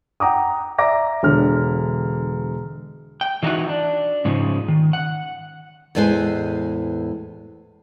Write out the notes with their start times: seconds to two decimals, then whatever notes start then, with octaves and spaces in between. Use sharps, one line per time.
0.20 F#5 G5 A#5 D6 D#6
0.78 D5 E5 A#5 D6 A#6
1.23 E1 D3 F6
3.21 G5
3.43 E3 A3 D#4 E4 F#4 F#5
3.69 D4
4.25 G#2 C#3 F3 D#4
4.68 D#3
4.93 F#5
5.95 E2 A2 G#3 B4 C5 G#5